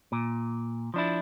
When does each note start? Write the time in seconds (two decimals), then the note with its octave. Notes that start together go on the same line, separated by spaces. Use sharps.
0.12 A#2
0.94 F3 D4 E4